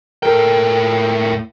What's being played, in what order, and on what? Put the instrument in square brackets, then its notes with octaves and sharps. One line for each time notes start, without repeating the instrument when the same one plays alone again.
[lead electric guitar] A2 G5 [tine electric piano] A4 A#4